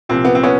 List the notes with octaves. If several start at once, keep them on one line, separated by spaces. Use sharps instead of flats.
C2 A#2 F3 C4
B3
C4
B3 C#4